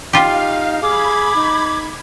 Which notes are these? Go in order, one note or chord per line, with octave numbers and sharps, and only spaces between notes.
D#4 F4 G4 F5
G#4 B5 D6 G#6
D#4